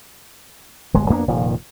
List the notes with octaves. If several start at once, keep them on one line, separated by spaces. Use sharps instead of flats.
D1 G1 G#3
F2 A#3 B3 D4
F1 A#2 D#3 F3